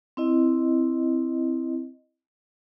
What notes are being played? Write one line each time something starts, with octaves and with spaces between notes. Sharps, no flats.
C4 E4 D#5